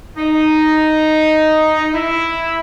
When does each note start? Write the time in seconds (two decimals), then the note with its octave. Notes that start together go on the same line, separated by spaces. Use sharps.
0.17 D#4
1.93 E4